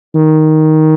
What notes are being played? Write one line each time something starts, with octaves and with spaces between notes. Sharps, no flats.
D#3